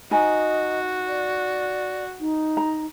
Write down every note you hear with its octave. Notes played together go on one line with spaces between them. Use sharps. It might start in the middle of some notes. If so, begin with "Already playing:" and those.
D#4 F#4 D#5 G#5 A#5
D5
D#4
A#5